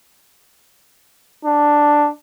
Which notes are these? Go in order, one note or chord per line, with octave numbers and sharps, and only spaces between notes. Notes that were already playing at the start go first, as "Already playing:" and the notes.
D4